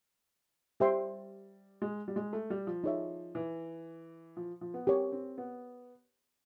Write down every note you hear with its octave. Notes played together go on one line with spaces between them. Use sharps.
G3 G4 C5 E5 G5 C6
G#3
G3
G#3
A3
G3
F3
D#4 G#4 C#5 E5
E3
F3
F3
B3
C4 G4 A#4 C#5
C4
B3